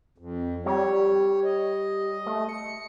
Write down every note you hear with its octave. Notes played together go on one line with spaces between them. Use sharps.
F2
G3 C#5
D#5
A3
C#7